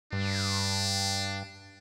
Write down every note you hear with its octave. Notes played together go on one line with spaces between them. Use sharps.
G2 D4